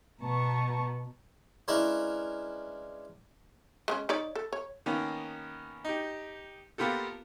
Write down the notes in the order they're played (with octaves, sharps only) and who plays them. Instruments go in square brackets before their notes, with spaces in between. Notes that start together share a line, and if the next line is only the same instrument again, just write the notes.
[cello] B2 B3 [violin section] A5 A#5 C#6
[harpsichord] G#3 C#4 D4 E4 A#4 B4
[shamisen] G#3 A3 C#4
D#4 C#5 D5
A4
C#5
[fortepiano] D#3 A#3 B3 C#4
D#4 G4
A#3 B3 F4 G4 A4